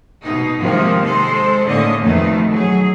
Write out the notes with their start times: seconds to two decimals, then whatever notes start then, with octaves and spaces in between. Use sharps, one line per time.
0.22 B2 D#4
0.59 G#2 C3 D#3 F3 G#3 A#3
1.03 G#3 A4 C5
1.65 A2 D3 D#3 A#3 C#4 D#5
2.01 F2 B2 D#3 A3 D#4
2.51 F#3 G#4